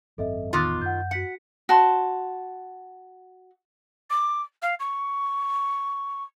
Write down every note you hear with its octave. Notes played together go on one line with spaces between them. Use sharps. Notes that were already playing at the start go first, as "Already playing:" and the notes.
G#1 F#2 C4 A4 D#5 E5
A1 E2 D#3 B3 F4 C6 D6 F#6
F#2 F#5 G6
F#4 F#5 B6 C#7
F#4 A5 C6
D6
F5
C#6